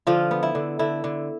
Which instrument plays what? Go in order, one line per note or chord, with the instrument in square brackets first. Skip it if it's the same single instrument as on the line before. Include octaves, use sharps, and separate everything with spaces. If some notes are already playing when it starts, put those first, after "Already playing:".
[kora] D3 F3 F4
B3
E4
D3
D3 E4
D3